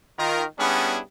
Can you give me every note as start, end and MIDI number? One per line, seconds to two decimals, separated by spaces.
0.18 0.44 51
0.18 0.44 65
0.18 0.44 70
0.59 1.00 55
0.59 1.00 59
0.59 1.00 61
0.59 1.00 62
0.59 1.00 64
0.59 1.00 68